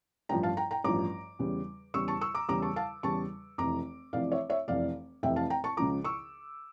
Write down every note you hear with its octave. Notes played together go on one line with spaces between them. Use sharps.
A1 G2 F3 G5 A#5
F5 A5
G5 A#5
G5 A#5
A1 G2 F3 A#5 D6
E2 C#3 G3
E2 C#3 G3 C#6 E6
A5 C#6
C#6 E6
A#5 D6
E2 C#3 G3 A#5 D6
A5 C#6
F5 A5
E2 C#3 G3 A5 C#6
F1 F2 E3 A#5 D6
F1 F2 E3 D5 F5
C#5 E5
C#5 E5
F1 F2 E3 D5 F5
F1 F2 E3 E5 G5
F5 A5
G5 A#5
A5 C#6
C#2 C#3 F3 A#5 D6
C#6 E6